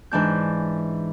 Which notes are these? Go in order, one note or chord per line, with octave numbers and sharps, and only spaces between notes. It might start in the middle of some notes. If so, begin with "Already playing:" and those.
G#2 E3 D4 G6